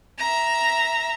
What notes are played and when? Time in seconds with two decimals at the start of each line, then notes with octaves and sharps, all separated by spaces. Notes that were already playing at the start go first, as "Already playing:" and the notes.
0.19 E5 A#5